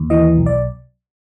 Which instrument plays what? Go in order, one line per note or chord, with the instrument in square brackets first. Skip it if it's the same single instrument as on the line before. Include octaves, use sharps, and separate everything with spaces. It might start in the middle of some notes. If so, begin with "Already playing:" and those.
Already playing: [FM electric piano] D#2
E3 D#5
B1
D5